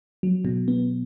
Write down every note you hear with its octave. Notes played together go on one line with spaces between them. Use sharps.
F#3
B2
B3